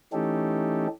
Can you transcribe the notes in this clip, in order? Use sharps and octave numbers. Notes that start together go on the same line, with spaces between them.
E3 A3 C#4 D#4 G4 A4